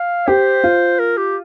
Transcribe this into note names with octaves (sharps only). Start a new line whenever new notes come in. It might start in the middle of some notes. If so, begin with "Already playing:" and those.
Already playing: F5
G4 C5
F4
A#4
G4